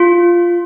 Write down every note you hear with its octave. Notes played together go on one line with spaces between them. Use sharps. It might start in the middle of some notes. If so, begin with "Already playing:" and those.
Already playing: F4